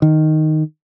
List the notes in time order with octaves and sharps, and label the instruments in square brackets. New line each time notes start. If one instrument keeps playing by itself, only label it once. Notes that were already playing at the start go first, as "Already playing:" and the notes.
[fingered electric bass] D#3